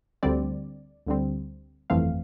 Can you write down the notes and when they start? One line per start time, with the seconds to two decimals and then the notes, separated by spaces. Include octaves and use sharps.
0.23 D2 D3 G3 C4 D5
1.07 D2 D3 G3 C4
1.90 G1 F2 E3 A3 C4 F5